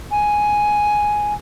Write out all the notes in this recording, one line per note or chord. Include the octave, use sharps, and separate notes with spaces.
G#5